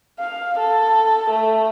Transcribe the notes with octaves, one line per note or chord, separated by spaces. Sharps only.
F5
A4
A3